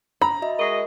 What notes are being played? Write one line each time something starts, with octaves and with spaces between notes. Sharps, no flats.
A#5 B5
F#4 D#5 E5
G#3 F#4 A#4 D#5